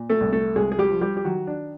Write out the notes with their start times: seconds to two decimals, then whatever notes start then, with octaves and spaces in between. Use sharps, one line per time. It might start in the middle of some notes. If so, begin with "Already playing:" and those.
Already playing: A#2
0.10 A3 A4
0.21 C2
0.32 A3 A4
0.56 C2 G#3 G#4
0.72 G#4
0.79 G3 G4
0.90 F3
1.01 G3 G4
1.17 G4
1.25 D#3 F#3 F#4
1.47 D4